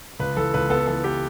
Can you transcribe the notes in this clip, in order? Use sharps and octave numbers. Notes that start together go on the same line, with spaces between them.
C#2 B4
E3 A4
C#2 B4
B3 A4
E3 A4
B3 G4